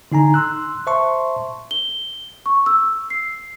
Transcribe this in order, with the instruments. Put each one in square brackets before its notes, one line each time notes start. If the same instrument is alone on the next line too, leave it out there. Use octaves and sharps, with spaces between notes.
[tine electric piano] D3 D#4 G#5 A#5
C6 E6 F#6
C5 E5 A5 C6 C#6
[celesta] G7
C#6
E6
C7